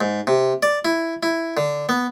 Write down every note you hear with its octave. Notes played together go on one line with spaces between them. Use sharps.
G#2
C3
D5
E4
E4
D3
B3